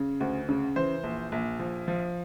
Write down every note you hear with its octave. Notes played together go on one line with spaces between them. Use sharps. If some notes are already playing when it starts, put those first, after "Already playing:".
Already playing: C#3
D2
C#3
E3 C5
A#1
A#1
F3
F3